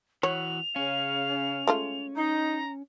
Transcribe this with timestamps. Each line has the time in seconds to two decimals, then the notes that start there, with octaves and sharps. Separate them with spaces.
0.23 E3 F#4 C#5 F7
0.76 C#3 C#4 F5
1.67 G#3 A3 F4
2.16 D#4 A#5